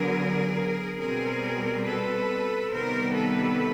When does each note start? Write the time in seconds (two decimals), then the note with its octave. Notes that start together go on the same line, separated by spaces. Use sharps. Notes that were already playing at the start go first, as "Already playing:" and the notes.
Already playing: D3 F#3 B3 G#4 A#4
0.99 B2 G3 C4 G#4 A#4
1.85 A4 B4
2.72 C3 D#3 G3 B3 A#4 C5
3.15 A4 B4